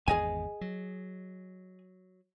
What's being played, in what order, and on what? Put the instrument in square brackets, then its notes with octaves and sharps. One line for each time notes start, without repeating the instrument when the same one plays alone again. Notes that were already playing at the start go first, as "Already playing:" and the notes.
[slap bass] G#1 E2 B3 [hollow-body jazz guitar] G#4 D#5 G#5
[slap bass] F#3